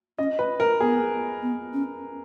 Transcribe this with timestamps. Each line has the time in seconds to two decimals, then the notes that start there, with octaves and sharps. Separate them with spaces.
0.18 C#4 D#5
0.39 B4
0.60 A#4
0.80 B3 G#4
1.42 B3
1.74 C#4